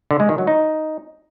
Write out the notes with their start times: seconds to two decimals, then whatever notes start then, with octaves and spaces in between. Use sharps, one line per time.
0.11 D3
0.20 G#3
0.29 D#3
0.38 F#3
0.47 D#4